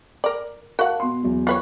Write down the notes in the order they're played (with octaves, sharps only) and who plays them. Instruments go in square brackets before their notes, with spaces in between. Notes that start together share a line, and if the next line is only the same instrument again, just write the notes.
[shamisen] A#4 D5
[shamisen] F#4 F#5 [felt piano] A#4 F5 A5
[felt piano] B2 C6
E2 F#3
[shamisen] F4 B4 C#5